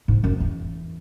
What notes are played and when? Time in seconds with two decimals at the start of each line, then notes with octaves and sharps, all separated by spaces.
0.08 G#2
0.24 F#2
0.40 E2